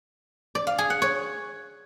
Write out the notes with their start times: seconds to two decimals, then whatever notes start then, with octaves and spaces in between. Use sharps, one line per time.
0.55 D5
0.67 F5
0.78 G#4
0.90 F#5
1.02 C#5